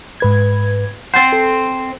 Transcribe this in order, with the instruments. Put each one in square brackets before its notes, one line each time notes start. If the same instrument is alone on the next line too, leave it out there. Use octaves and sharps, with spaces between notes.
[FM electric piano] G#2 B4 G#6
[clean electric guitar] C4 C5 [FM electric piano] F#5 A6
[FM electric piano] A4